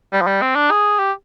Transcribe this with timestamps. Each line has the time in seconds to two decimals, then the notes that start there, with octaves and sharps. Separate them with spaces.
0.13 G3
0.21 F3
0.27 G3
0.42 C4
0.55 D4
0.71 G#4
0.99 G4